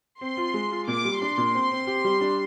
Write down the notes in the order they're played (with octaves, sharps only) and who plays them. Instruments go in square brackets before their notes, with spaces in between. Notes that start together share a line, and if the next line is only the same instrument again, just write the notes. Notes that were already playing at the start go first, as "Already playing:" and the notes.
[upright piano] C4 [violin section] C6
[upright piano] F4
G#3
F4
[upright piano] A#2 [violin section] D6
[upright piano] G3
[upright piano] D4 [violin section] C6
[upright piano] A#2
C4
C4
G4
G3
D4